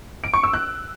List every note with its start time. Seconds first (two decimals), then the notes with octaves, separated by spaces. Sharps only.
0.24 D7
0.34 C#6
0.43 E6
0.53 F#6